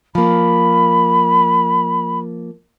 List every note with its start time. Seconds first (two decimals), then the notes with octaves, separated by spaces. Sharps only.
0.15 F3 A#3 B5